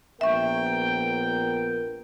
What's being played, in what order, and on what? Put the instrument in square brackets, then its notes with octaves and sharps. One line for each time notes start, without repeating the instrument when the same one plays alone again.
[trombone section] A#1 B3 A#4 [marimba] E5 C#6 [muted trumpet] G5